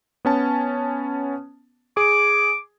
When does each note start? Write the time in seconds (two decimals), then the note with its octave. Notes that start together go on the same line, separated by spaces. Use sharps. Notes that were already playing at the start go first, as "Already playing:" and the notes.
0.25 B3 C#4 A5
1.97 G#4 D6